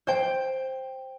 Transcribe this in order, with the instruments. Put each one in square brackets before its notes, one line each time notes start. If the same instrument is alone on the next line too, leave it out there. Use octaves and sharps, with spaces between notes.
[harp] C5 G5